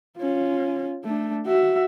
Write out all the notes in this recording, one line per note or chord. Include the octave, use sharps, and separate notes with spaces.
C#4 F4
A3 D4
F#4 E5